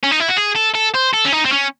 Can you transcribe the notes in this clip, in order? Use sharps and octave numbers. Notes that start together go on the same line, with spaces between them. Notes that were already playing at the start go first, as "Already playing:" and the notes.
C#4
D#4
E4
F#4
G#4
A4
A4
C5
A4
C#4
D#4
C4
C#4